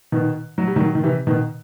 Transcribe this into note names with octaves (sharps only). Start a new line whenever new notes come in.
B2 D#3
F#3
G3
D#3 F#3
D#3
C3 E3
B2 D#3